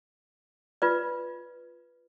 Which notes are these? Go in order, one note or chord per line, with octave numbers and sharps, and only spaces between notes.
F4 B4 D5